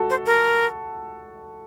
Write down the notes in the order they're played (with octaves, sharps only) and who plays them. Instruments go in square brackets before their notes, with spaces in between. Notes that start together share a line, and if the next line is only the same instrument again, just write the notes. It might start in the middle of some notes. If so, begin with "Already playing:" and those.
Already playing: [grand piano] F#4 A4
[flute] C5
A#4